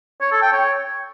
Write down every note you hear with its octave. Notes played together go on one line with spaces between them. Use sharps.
C#5
A4
G5
C#5